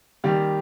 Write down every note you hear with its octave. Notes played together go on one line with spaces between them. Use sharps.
D#3 G3 A#3 G4